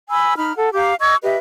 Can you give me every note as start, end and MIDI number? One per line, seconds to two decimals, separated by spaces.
0.10 0.36 80
0.10 0.36 83
0.10 0.36 88
0.37 0.52 63
0.37 0.52 83
0.37 0.52 89
0.56 0.69 69
0.56 0.69 78
0.75 0.94 67
0.75 0.94 77
0.75 0.94 82
0.75 0.94 86
1.00 1.15 75
1.00 1.15 85
1.00 1.15 88
1.00 1.15 92
1.23 1.37 67
1.23 1.37 71
1.23 1.37 75
1.23 1.37 76